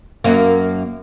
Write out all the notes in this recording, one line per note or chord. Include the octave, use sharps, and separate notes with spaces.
F#2 A#3